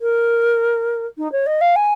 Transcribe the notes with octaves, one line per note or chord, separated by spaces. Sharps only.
A#4
D#4
C#5
D#5
F5
G#5